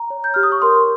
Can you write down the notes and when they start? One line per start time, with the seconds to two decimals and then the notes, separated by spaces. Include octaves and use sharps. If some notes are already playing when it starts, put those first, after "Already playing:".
Already playing: A#5
0.10 C#5
0.24 G6
0.34 G4 F6
0.43 D#6
0.52 C#6
0.62 A#4 C6